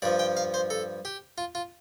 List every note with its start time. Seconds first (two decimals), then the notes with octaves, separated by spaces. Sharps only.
0.02 G2 F3 D5
0.19 G5
0.37 F5
0.54 C5
0.70 A4
1.05 G4
1.38 F4
1.55 F4